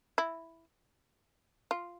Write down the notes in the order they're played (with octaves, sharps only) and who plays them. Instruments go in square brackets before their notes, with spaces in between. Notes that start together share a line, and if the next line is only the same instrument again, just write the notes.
[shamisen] E4
F4